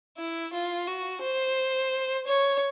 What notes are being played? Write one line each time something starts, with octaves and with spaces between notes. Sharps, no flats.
E4
F4
F#4
C5
C#5